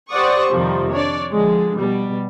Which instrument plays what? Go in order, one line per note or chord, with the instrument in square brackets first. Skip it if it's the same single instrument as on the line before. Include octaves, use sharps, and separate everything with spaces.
[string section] G4 C5 D5 F#5 C#6 D#6
F2 C3 D#3 F3 G3
D4 C#5 D5
D3 F3 G#3
B2 G3